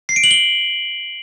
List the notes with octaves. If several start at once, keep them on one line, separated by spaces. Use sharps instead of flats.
C7
D7
F#7
G7